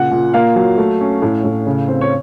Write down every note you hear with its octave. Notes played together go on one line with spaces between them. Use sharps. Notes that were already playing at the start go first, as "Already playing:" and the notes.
Already playing: A#2 C#3 F#5
A#2
A#3 F5
F#3
A3
C#4
A2
A2
C#3
C4
C#5